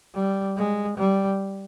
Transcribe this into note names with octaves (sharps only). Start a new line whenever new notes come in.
G3
G#3
G3